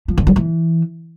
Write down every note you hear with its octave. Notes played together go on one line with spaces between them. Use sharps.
F3
D3
F#3
E3